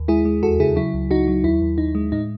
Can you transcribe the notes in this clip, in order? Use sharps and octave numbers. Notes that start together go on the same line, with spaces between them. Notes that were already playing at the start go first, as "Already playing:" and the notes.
Already playing: D#2
G#3 E4 G#4
G#3
E2 F#4 A4
C#3 E4 G#4
F#3 E4
C#2
C#2 D#4 F#4
F#3
D#2 E4
D#2
D#2 D#4
G#3
A2 D#4